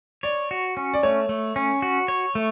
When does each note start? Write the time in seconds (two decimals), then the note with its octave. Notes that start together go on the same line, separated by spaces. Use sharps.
0.23 C#5 D5
0.51 F#4
0.77 C#4
0.93 D5
1.03 A3 C#5
1.29 A3
1.56 C#4
1.82 F#4
2.08 C#5
2.35 A3